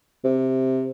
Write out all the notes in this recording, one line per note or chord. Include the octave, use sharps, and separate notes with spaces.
C3